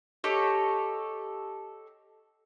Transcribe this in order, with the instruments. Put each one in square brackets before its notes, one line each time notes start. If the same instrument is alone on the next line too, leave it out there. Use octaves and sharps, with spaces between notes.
[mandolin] G4 A4 C#5 D#5